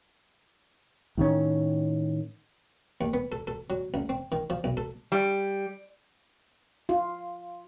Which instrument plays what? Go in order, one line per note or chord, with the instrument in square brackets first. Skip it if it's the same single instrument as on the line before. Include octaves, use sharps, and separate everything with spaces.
[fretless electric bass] A2 D#3 C#4
[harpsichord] D#2
B3
A4
A4
F#3
C#2
C4
D#3
F3
B1
A4
[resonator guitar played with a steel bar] G3
[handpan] F4